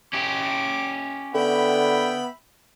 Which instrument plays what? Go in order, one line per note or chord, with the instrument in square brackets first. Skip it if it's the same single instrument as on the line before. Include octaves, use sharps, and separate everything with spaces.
[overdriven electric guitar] C#4 G4 [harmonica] D6
[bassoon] D3 [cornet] B3 [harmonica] E5 G5 B5